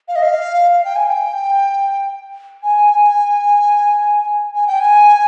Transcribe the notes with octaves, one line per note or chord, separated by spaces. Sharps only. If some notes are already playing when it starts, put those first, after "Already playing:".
F5
D#5
F5
F5
G5
G#5
G5
G#5
G#5
G5
G#5